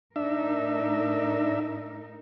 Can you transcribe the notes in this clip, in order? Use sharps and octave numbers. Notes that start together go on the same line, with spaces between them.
A2 D4 D#4 A#4 E5